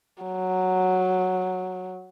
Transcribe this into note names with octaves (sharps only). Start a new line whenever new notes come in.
F#3